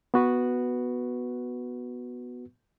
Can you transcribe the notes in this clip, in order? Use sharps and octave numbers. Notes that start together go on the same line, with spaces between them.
B3 F#4 B4